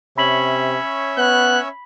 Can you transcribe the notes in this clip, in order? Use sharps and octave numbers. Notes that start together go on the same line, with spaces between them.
C3 C#4 C#5 E5 B5 B6 F#7
B3 F#6